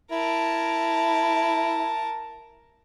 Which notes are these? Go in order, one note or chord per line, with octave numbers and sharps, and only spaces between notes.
E4 A#4 A5